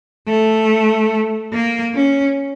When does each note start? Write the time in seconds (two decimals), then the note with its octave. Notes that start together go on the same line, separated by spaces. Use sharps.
0.28 A3
1.53 A#3
1.95 C#4